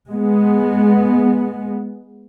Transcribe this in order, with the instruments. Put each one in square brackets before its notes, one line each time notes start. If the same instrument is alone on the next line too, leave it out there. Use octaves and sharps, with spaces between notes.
[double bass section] G#3 B3